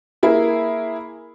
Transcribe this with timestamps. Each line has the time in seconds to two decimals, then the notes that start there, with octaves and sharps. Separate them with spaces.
0.23 A#3 E4 G#4